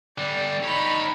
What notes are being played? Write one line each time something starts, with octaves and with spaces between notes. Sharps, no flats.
D3 G3 D5
D#4 C#5 B5